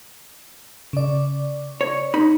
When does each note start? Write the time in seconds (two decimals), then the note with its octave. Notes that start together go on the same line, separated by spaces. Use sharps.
0.93 C#3 D5
1.81 C#5
2.14 D#4 B5